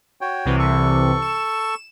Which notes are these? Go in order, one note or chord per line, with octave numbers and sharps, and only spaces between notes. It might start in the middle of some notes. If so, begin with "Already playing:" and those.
F#4 C#5 G5
C2 C3 E3
A4 C#6
E7